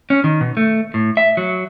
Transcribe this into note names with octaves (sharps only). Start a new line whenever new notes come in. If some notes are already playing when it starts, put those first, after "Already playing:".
C#4
D#3
B2
A3
A2
E5
F#3